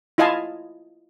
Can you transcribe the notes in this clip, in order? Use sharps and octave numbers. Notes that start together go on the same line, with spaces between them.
E4 F4 D#5 F5 G#5 A5